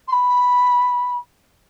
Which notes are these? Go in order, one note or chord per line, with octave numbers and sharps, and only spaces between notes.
C6
B5